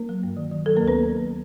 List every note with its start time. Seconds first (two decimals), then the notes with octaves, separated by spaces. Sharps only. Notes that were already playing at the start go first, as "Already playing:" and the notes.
Already playing: A#3 A#4
0.09 F#3
0.23 G2
0.37 D#3
0.51 D#3
0.66 F#3 A4
0.76 A#3 A#4
0.81 D2
0.88 B3 B4